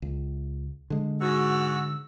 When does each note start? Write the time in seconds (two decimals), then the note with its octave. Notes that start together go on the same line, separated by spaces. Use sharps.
0.02 C#2
0.90 D3 G#3
1.20 G#2 F#4 E6